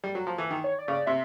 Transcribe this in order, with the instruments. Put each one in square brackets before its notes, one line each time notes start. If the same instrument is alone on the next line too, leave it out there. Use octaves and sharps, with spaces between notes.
[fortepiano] G3
F#3
F3
E3
D#3
[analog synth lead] C#5
D5
[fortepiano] C#3
[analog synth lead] D5
[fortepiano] C3 [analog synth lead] E5